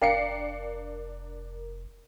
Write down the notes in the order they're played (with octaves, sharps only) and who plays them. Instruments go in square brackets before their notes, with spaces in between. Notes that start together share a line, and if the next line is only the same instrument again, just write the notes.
[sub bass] F1 [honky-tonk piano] D4 C7 C#7 [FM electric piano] A#4 [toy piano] F5 G5